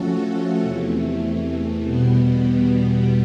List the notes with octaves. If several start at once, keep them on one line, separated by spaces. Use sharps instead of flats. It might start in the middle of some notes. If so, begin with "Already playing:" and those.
Already playing: F3 A3 C#4 F#4 A4
E2 C3 E3 A3
E2 B2 G3 B3